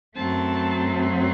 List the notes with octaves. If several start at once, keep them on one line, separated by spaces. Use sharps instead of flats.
F#2 F#3 A3 C4 A5